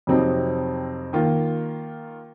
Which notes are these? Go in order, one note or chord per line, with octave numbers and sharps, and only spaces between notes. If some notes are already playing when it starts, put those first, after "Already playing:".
F2 C3 F#3 C4 D#4
D#3 A#3 F4